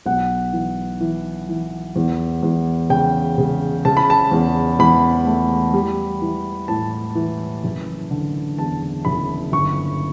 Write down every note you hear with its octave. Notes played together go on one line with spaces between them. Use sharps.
B1 F#5
E3
E3
E3
E2
E2
C#3 G5
C#3
C#3 A5
B5
A5
E2
E2 B5
A3
G3
E3
A2 A5
E3
F#1
D3
E2 A5
F#1 B5
G1 C#6